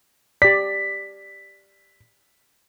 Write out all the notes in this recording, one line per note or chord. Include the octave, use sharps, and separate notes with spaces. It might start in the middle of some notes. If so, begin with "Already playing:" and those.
G4 D5 B6